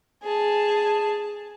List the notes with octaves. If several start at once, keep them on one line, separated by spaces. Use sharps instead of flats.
G#4 A5